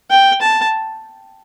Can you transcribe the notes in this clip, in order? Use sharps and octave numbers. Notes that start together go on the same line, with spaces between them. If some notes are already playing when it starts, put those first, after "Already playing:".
G5
A5